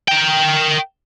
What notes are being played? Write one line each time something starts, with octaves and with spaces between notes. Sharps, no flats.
A#4 G5